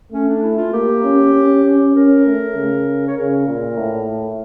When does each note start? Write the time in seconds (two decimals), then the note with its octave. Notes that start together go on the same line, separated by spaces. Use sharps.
0.12 A3 C#4
0.28 D4
0.43 E4
0.57 F4
0.73 A#3 G4
1.04 C#4
1.34 C#4
1.64 C#4
1.95 C#4 A#4
2.26 A3
2.56 C#3
3.07 C#5
3.17 C#3 A#4
3.47 A#2
3.77 A2